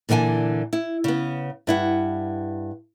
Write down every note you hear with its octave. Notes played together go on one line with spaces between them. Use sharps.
A#2 D3 E3 G5 G#5
E4
C#3 B3
G2 E4 F#5